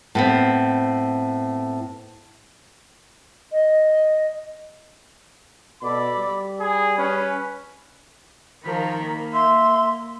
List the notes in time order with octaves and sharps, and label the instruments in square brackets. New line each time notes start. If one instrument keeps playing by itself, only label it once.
[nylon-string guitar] A2 B3 C4
[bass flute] D#5
[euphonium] B2 [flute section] A4 D5 D6 [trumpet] B5
[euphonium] G3
[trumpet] G#4 [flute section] B5
[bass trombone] C#4 [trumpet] B4
[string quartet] D#3 F3 A#4 [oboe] B5
[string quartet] A#3
[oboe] E5 [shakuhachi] C6